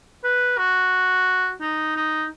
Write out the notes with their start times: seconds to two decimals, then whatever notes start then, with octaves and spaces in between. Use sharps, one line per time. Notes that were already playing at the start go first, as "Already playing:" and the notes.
0.24 B4
0.58 F#4
1.61 D#4
1.96 D#4